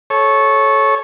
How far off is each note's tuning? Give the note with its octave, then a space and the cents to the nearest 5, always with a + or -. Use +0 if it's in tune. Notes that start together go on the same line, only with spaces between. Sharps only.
A4 -20 C#5 -10